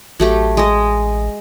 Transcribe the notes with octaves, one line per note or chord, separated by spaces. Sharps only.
A1 F#3 A3 G4
G#3 D#5